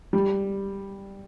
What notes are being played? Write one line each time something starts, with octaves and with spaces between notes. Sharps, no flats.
G3